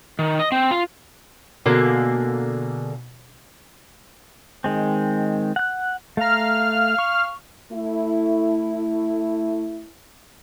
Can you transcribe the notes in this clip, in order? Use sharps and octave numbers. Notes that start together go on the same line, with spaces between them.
D#3
D#5
C4
F4
B2 D3 A#3 G#4
D#3 G#3 C4
F#5 F#6
A3 F5 A#5 F6
C#6
A3 E4